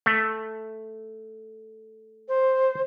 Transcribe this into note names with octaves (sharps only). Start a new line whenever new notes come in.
A3
C5